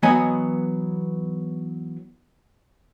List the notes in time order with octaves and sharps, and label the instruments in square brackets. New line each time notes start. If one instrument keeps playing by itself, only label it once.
[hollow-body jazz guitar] E3 F#3 B3 C#5 D#5 G#5